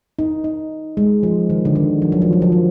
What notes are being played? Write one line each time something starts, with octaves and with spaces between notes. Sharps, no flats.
D#4
D#4
G#3
F3
D#3
D3
D#3
F3
F#3
F3
F#3
F3
F#3